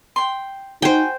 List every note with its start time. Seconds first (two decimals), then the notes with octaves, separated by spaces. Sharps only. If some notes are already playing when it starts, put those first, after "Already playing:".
0.16 G5 C6
0.82 D#4 F#4 C5 G5 G#5